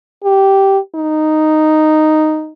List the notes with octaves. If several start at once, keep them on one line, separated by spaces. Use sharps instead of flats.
G4
D#4